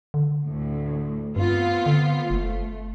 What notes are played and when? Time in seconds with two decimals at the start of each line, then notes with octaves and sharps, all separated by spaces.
0.14 D3
0.45 D2 A2
1.36 G2 B3 C4 F4
1.86 D3
2.30 F#1 A3